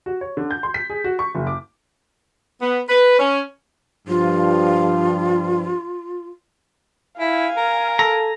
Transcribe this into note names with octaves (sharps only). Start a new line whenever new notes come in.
F#4
C#5
D3
G6
C6
B6
G#4
F#4
C#6
F#1
D6
B3
B4
C#4
G2 F3 F4
E4 F5 G#5
A#4
A4 A#5